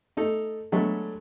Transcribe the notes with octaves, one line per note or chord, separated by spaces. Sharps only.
A3 D#4 A4
D3 F#3 G#3 A3 B3